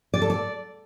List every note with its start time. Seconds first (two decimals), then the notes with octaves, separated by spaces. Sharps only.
0.14 D5
0.22 A4
0.30 D5